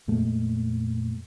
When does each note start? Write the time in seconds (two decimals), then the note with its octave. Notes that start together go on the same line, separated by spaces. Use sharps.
0.07 F2 A#2 G#3 A3